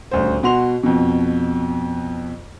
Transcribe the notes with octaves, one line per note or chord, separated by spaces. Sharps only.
D#1 D2 C5
B2 F#4 C6 F7
F2 B2